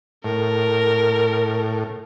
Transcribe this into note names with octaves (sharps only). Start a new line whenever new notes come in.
A2 A#4